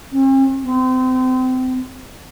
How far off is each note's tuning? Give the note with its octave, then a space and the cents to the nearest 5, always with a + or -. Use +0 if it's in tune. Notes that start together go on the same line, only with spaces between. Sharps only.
C4 +45
C4 -30